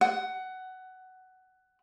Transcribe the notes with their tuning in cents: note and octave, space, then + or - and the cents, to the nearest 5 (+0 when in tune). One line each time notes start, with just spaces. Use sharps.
F#5 +15